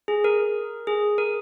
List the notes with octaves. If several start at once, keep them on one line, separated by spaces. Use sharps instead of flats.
G#4
A#4
G#4
A#4